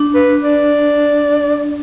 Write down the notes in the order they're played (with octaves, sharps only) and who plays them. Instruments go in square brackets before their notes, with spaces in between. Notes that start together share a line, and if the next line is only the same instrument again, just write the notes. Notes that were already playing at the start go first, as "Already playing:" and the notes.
Already playing: [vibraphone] D4
[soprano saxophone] B4
D5